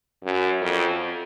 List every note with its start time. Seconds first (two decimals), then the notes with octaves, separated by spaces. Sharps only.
0.24 F#2
0.62 F2